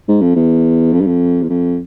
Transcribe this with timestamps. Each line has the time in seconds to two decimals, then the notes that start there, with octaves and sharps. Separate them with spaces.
0.08 G#2
0.22 F2
0.36 E2
0.93 F2
1.01 G2
1.07 F2
1.42 E2
1.50 F2